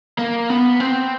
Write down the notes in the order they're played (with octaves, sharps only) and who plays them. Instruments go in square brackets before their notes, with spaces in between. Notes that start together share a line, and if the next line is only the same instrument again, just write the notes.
[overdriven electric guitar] A#3
B3
C4